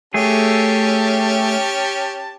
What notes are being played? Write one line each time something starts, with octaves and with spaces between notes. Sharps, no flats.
A3 C#4 G4 G#4 A5